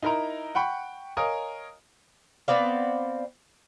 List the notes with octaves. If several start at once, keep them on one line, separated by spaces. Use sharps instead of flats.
D#4 E4 A#4 E5 A#5
F#5 G5 B5 C#6
A#4 C#5 D#5 F5 G#5 D#6
B3 C4 D5 F5